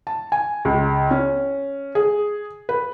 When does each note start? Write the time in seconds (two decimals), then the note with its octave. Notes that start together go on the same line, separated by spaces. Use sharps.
0.07 A5
0.32 G#5
0.65 C#2
1.11 C#4
1.95 G#4
2.69 B4